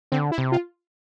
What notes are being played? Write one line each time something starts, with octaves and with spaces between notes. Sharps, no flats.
D3 C4
E4
C3
F4